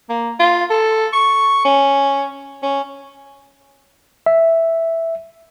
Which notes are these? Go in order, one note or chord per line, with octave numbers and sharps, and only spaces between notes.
A#3
F4
A4
C#6
C#4
C#4
E5